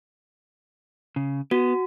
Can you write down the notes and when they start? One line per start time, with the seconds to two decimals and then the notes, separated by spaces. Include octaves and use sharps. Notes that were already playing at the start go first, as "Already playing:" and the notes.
1.16 C#3
1.51 B3 F#4